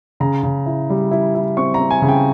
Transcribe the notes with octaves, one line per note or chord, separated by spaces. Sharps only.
C#3 A#5
C#3
E4
G3
E4
E4
C4 C#6
A#5
C4
G#5
C#3
G5